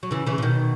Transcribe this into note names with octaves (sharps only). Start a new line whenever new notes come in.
F#3
C#3 E3
C#3 E3
C#3
B2 D#3